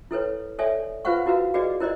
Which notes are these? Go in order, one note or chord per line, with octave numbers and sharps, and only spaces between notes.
E4 A4 B4 C#5
A4 C#5 D5 E5 G#5
F4 B4 C5 F5 F#5 C#6
E4 F#4 A#4 B4 F5
F#4 G#4 B4 D5 D#5
E4 A#4 C5 D5 D#5